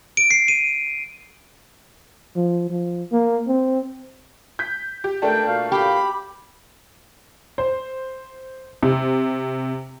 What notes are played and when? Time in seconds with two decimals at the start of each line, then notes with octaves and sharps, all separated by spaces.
0.17 D7
0.31 C7
0.48 D#7
2.36 F3
2.70 F3
3.12 A#3
3.47 C4
4.59 G6 B6
5.04 G4
5.22 C#2 A3 D4 A#4 G5 A5
5.47 A#2 F#4 F5
5.72 G4 B5
7.58 C5
8.83 C3